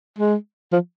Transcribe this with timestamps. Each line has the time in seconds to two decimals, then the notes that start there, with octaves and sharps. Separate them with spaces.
0.18 G#3
0.72 F3